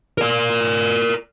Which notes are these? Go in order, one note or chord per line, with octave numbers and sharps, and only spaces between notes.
A#4 D5